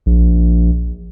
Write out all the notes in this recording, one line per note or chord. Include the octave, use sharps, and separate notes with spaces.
A#1